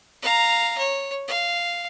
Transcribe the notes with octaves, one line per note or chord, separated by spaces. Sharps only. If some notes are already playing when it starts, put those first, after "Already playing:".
F5 A#5
C#5
F5